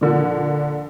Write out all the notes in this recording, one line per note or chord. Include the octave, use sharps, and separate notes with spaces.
A#2 D3 F3